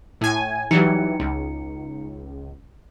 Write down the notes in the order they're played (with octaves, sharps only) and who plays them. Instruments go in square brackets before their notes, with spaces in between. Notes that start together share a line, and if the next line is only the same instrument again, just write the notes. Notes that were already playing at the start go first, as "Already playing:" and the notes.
[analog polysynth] A2 G#5
[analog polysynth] E3 F#3 G3 [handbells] D#4 C#7
[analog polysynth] C#2